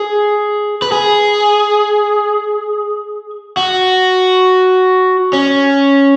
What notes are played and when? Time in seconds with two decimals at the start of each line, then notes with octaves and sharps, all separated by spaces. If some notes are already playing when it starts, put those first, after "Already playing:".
Already playing: G#4
0.82 B4
0.92 G#4
3.57 F#4
5.33 C#4